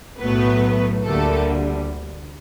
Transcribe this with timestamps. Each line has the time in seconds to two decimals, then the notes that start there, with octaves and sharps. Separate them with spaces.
0.19 B1 A2 F#3 A3 B3 B4
1.05 D2 D3 G3 A3 A#3 A4